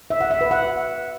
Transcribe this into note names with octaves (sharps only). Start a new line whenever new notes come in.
E5
F#5
E5
B4
F#5